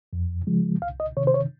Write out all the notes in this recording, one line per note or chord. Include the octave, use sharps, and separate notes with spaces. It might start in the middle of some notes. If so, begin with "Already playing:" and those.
F2
C#3 F3 G#3
C2 F5
D#5
C3 D#3 C#5
C5
C#5